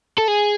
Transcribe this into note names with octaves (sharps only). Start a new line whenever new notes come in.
A4
G#4